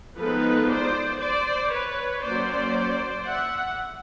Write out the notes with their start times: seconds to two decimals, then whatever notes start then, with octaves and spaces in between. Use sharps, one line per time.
0.17 F3 G#3 B3 D#4 A4 B4
0.68 C5 D5
1.19 C5 D5
1.70 B4 C#5
2.22 F#3 A#3 C#4 C5 D5
3.24 E5 F#5